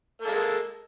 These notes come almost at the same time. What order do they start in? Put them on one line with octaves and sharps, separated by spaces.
A#3 A4 G#3